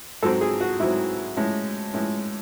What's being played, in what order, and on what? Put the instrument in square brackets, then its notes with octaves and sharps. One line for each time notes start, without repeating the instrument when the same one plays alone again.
[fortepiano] G#2 F#3 C4 A4
G#4
F#4
G#2 F#3 C4 E4
A2 G#3 C#4
A2 G#3 C#4